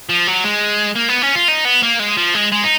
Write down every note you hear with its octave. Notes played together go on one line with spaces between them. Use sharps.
F3
F#3
G#3
A#3
B3
C#4
F4
D#4
B3
A#3
G#3
F3
G#3
G#3
D#4